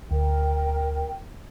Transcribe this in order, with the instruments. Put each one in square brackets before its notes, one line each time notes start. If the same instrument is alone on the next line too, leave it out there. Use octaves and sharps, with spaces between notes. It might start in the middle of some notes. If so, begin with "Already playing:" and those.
[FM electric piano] D2 [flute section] A#4 G5